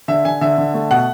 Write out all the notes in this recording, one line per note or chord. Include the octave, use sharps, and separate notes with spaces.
D3 E5
D3 G#5
D3 E5
D3
A3
B2 F#5